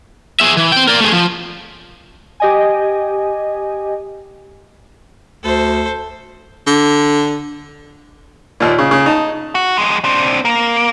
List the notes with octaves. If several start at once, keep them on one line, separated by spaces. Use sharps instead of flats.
G#4 E5
E3
C4 G5
A#4 D5
A3 G#4
F3
G4 D#5 G#5
D2 A4 C5
D3
D#2 A#2
C#3
C#3
D#4 A5
F#4
F2 G#3
C4 D4
A#3